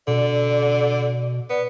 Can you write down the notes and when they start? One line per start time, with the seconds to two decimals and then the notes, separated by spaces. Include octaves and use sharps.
0.08 B2 D3 D5
1.50 B3 D5